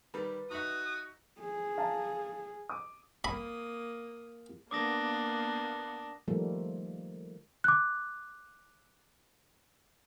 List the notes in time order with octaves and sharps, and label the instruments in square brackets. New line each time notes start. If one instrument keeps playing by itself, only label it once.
[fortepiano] D#3 G3 [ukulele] B4
[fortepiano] D#4 E5 [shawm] F#4 [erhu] D#6
[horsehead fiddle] G#4
[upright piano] F5 A5 A#5
D6 D#6
[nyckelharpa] A#3 D#6 [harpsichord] B5
[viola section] A#3 B3 [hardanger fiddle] D4 [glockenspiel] D6 D#6 A#6
[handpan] D#3 F3 G3 A3 A#3
[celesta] D6 F#6